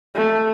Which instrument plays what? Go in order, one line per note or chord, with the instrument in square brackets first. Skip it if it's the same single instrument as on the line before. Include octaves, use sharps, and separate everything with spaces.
[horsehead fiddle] A3